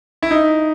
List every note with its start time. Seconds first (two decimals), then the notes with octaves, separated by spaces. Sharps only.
0.22 E4
0.31 D#4